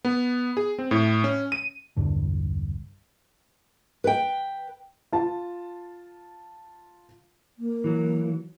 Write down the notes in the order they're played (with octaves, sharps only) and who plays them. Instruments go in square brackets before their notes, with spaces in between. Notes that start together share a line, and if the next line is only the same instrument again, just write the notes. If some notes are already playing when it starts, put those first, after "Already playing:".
[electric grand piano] B3
G#4
C4
A2
C#4
D#7
[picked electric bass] E1 C2 G2 D3
[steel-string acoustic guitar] B4 G5
[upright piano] F4 A5
[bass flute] A#3
[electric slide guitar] E3 F#3